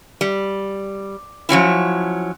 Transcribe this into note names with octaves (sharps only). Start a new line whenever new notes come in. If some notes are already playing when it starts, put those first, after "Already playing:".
G3
F3 F#3 C#4 E4